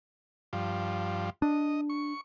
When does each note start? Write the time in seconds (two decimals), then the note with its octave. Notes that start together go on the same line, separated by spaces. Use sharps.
0.53 G2 F3
1.42 D4 D#5
1.90 C#6